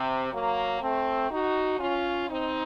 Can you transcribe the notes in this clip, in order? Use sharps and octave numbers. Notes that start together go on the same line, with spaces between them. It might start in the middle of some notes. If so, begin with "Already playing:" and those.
Already playing: C3
F#3 A#3
A3 C4
D#4 F#4
C#4 F4
C4 D#4